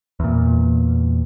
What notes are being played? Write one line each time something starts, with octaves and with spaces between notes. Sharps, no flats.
E2 A#2